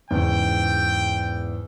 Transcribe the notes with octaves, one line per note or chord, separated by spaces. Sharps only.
E2 G#2 C#3 G5